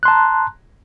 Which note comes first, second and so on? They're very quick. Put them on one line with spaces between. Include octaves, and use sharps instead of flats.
F#6 C6 A5 A#5